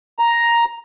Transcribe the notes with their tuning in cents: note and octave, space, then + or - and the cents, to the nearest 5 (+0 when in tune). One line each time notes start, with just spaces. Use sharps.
A#5 +5